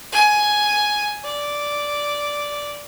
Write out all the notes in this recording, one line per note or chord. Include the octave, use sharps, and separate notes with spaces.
G#5
D5